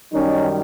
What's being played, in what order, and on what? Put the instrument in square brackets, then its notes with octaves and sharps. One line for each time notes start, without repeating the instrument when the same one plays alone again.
[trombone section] F#2 D#3 G3 C#4 D#4